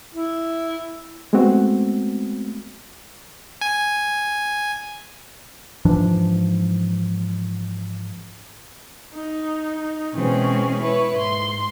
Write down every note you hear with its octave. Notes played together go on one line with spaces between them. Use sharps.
E4
G#3 A3 B3 C4 F#4
G#5
G#2 E3 F3 D4
D#4
B2 E3 G#3 C4 C#4 G#4
E4 B4 C#5
G#2 C6